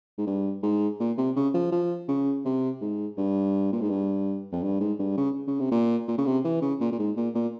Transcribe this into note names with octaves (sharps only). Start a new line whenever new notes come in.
G#2
G2
G#2
A#2
C3
C#3
F3
F3
C#3
C3
G#2
G2
A#2
G#2
G2
F2
G2
G#2
G2
C#3
C#3
C3
A#2
A#2
C#3
C3
E3
C#3
A#2
A#2
G#2
A#2
A#2